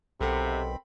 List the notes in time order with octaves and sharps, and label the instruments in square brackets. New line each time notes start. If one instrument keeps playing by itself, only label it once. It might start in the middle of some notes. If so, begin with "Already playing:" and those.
[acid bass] B1 [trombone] C3 [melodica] C4 B5 [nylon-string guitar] A4 A#4 F#5